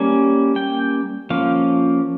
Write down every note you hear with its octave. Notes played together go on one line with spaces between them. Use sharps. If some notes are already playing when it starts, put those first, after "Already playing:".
Already playing: G3 A#3 C#4
G5
F3 A#3 C#4 F5